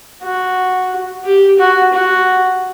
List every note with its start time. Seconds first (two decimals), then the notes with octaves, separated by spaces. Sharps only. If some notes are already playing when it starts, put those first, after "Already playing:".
0.22 F#4
1.24 G4
1.58 F#4
1.93 F#4